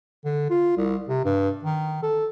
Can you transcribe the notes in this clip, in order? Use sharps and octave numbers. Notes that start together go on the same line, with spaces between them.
D3
F4
C2
C3
G2
D#3
A4